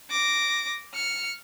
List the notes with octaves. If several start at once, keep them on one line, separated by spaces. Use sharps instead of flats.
D6 A#6
F6 C#7